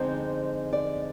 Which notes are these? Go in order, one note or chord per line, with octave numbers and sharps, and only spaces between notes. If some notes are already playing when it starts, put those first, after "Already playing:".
Already playing: F2 D3 G#3 C4 D#4 C5
D5